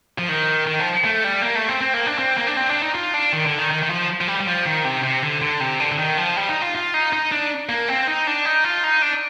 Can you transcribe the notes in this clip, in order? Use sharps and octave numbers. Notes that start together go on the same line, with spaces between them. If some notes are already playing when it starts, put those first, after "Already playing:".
F3
D#3
D#3
F3
A3
G3
A#3
A3
C4
C4
A#3
D4
C4
A#3
D4
C4
D4
D#4
F4
D4
D#3
D3
D#3
D#3
D#3
F3
F3
G3
G3
F3
D#3
C3
C3
D3
D3
C3
D3
D3
D#3
F3
G3
D#4
F4
F4
D#4
D#4
D4
A#3
C4
D#4
D4
D#4
F4
D#4
D4